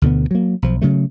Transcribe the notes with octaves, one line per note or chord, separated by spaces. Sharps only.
D2 B2 D3 B3
F#3 A#3
B1 F3
C#3 F#3 A3